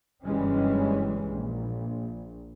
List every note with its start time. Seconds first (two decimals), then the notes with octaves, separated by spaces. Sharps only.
0.24 F#1 G2 E3 G3 G#3 C#4
1.27 A#1